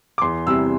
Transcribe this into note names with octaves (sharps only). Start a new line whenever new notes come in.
D6
E2 C6
C3 E3 G3 E6